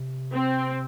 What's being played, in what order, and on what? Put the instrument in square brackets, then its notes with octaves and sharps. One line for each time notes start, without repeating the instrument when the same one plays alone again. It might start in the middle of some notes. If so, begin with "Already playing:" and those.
Already playing: [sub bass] C3
[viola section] C4